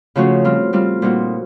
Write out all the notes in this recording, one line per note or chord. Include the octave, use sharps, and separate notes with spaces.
C#3 F3 A3 C#4 F#4
G3 C4 F4
G3 C4 F4
A#2 G3 C4 D#4 F#4